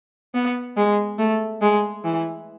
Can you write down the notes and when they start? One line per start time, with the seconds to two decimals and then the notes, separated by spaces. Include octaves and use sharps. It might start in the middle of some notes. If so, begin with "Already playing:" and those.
0.35 B3
0.77 G#3
1.18 A3
1.61 G#3
2.04 E3